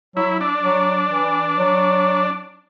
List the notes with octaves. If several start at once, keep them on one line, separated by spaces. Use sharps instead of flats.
F#3 E4
D4
F#3
E3
F#3